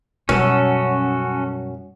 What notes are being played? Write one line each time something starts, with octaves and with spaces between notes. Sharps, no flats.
F#2 B2 G3 C#4 F#4 A4